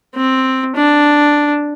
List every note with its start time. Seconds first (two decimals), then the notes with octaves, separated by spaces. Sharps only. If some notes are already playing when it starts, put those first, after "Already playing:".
0.15 C4
0.75 D4